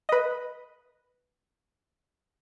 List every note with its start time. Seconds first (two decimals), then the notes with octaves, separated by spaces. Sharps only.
0.09 B4 D#5